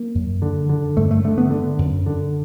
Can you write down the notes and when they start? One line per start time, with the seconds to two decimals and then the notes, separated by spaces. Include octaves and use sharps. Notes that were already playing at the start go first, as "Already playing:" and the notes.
Already playing: A#3
0.15 F#2
0.42 D3
0.69 D3
0.97 G2 A3
1.11 A3
1.24 D3 A3
1.38 B3
1.51 D3
1.79 F#2
2.06 D3